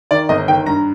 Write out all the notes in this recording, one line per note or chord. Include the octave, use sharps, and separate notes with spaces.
D#3 D5
G1 D#5
D#3 G5
G2 A#5